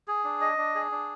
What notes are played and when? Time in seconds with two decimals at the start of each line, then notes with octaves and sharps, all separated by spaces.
0.08 G#4
0.24 D4
0.41 D#5
0.58 D4
0.75 G#4
0.92 D4